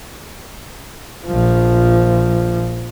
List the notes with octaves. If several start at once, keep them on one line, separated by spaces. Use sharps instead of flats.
A#1 F3